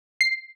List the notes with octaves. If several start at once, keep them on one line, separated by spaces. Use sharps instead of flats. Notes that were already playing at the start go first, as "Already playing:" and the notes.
C7